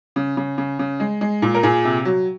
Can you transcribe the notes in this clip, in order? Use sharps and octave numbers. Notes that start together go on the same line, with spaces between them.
C#3
C#3
C#3
C#3
G#3
G#3
A#2
A#4
A#2 G#4
C3
F#3